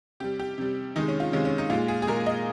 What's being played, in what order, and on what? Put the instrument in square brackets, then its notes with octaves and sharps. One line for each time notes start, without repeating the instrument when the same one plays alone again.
[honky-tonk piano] C3 G3 G4
G4
C3 G3
C3 D#3 G#3 D#4
C#4
F4
C3 D#3 G#3 C#4
C#4
D#4
A#2 G#3 F4
G#4
G#4
A#2 G#3 A#4
D#5